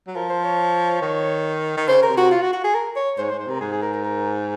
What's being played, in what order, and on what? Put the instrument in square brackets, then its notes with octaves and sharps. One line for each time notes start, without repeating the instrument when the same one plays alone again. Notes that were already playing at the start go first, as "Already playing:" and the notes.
[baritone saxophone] F#3
[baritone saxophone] F3 [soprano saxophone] A#4
[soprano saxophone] C5
C#5
C#5
[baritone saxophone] D#3
D#3
[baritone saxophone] C#3 [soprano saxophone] C5
[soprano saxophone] A#4
[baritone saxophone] C3
[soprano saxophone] F#4
F4
F#4
F#4
G#4
A#4
C#5
[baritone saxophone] G#2 [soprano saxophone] C5
[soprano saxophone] C#5
C5
[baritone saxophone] G#2
[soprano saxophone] C5
[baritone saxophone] C3 [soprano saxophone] A#4
[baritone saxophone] G#2 [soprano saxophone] G#4
[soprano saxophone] G#4
A#4
A#4
A#4